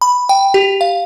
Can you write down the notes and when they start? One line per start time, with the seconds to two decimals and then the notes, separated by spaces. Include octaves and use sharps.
0.01 B5
0.29 G5
0.54 G4
0.81 F5